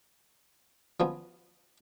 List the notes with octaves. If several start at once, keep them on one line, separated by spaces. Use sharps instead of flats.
F3 B3 C#4